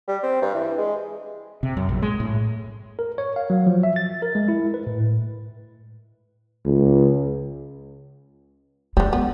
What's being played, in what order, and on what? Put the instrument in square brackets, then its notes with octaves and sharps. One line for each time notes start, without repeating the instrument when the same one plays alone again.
[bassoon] G3
C4
G2
E3
G#3
[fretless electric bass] C3
F#2
A#1
G#3
A2
[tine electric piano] A#4
C#5
F5
F#3
F3
E5
A6
A#4
G#3
E4
B4
A2
[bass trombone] C#2
[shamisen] D3 G3 [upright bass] G#3
[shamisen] B3